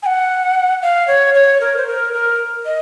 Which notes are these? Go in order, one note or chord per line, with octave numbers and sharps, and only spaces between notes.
G#5
F#5
F5
C#5
C#5
A#4
C5
A#4
A#4
D#5